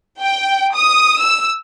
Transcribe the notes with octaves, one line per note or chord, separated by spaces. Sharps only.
G5
D#6
E6